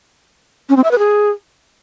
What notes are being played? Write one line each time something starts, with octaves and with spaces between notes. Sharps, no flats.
C#4
C4
E5
B4
G#4